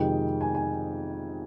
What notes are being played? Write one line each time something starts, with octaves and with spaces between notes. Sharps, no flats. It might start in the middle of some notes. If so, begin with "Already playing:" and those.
Already playing: F2 C3 D#3 G#3 G5
G#5
G#5